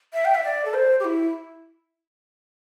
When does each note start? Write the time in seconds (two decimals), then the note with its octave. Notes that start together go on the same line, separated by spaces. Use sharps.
0.14 E5
0.25 G5
0.35 E5
0.44 D5
0.65 A4
0.74 C5
1.00 G4
1.05 E4